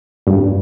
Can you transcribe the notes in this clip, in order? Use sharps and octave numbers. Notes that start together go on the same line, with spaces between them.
G2